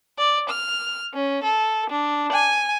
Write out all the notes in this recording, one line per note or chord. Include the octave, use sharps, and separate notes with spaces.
D5
F6
C#4
A4
D4
G#5